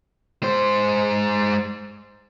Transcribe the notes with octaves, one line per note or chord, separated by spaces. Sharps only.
G#3 C5